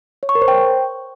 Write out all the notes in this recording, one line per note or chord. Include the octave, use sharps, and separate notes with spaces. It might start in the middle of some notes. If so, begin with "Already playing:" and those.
C#5
C#6
A#4
C5
G5